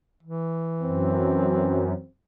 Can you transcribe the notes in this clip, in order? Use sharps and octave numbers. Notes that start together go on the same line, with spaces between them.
E3
F#2 C4